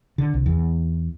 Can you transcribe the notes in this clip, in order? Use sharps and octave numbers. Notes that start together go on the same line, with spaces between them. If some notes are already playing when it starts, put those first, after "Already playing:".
D3
C2
E2